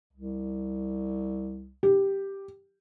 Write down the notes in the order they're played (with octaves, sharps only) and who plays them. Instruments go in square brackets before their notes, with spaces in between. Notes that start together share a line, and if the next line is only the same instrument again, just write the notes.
[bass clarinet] C2
[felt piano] G4